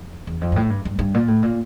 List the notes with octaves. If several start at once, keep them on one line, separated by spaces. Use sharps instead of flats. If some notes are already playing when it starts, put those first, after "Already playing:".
Already playing: F2
E2
F2
G2
A2
G2
G2
G2
A#2
A2
A#2